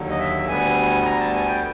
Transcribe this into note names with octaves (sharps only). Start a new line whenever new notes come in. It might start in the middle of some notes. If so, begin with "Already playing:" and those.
Already playing: D#2 D3 F#3
D#5
E5
D2 D3 G3 B3 G#5
A#5
A5
G#5
G5